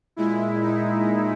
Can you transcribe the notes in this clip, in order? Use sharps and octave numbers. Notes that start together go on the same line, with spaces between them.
A#2 G#3 E4
D#4